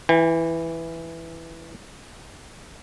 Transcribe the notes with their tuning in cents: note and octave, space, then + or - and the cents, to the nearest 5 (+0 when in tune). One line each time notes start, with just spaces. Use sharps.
E3 +0 G5 +45